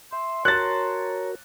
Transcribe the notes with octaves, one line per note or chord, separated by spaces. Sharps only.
E5 C6
F#4 A#4 C#5 A5 A#5 F#6 A6